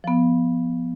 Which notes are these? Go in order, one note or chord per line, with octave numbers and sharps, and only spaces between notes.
F3 B3